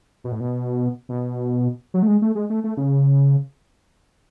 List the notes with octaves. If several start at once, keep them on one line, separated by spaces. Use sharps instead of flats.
B2
A2
B2
B2
F#3
A3
G#3
A3
G#3
A3
A3
C#3